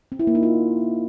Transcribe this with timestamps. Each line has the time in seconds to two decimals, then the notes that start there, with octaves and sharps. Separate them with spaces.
0.12 C4
0.19 E4
0.27 A#3
0.35 D#4
0.43 F4